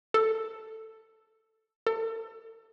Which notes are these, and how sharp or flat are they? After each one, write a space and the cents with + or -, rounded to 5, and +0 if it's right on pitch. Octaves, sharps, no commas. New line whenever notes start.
A4 +10
A4 +40